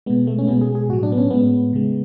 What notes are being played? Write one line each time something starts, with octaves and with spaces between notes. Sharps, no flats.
B2 G#3 B3
A3
C#4
B2 G#3 B3
G#4
G#4
A2 F#3 F#4
D4
B3
C#4
A2 G#3 B3
C#3 G#3